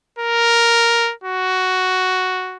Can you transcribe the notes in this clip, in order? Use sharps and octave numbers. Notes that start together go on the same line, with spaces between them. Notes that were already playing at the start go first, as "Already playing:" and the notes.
A#4
F#4